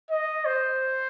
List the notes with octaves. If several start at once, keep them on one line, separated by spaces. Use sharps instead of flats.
D#5
C5